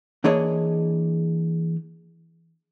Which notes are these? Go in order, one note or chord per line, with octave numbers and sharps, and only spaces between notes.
E3 A#3 D4 G#4 C#5 D#5